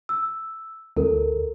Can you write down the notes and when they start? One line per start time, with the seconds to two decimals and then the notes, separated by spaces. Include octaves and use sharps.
0.09 E6
0.97 D2 A4 A#4